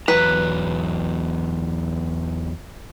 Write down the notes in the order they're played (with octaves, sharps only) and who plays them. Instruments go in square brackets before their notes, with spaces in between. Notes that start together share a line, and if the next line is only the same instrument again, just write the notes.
[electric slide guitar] E2 F#3 A#5 [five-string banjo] B4